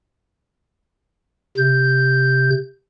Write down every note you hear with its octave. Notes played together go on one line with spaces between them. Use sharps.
C3 G6